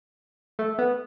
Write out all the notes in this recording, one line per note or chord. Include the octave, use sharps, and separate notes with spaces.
A3
B3